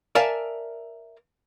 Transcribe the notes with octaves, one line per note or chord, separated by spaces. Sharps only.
A#4 D5 E5 F5 G#5 A5